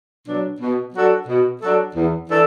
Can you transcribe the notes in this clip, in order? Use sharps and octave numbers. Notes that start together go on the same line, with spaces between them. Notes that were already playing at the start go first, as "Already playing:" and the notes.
B2 F#3 D4
B2
F#3 D4 F#4 A4
B2
F#3 D4 F#4 A4
E2
E3 D4 A4